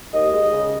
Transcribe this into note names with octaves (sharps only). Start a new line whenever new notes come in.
D#2 D#5
G#3
C#3